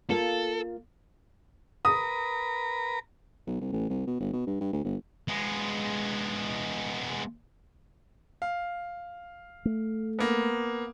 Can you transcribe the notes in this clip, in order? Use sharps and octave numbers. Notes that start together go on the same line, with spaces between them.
A#3 F4 A4
A#4 B4 A#5 D#6
B1
C2
A1
C2
B2
G1
B2
G2
G2
D2
G1
G#3 B3
F5
A3
A#3 B3